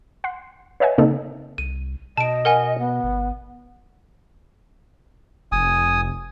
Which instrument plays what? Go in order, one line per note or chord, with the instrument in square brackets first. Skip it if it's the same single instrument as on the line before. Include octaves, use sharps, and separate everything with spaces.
[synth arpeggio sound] F#5 C6
B4 C#5 D#5 E5 F#5 G#5
C#3 A#3 C4 D#4 A4
[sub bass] C2 [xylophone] D#7
[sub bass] B2 [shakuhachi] D#5 [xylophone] A5 D7
[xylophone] A#4 F#5 G#5
[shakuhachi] B3
[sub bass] G1
[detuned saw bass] F1 [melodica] G#5 D#6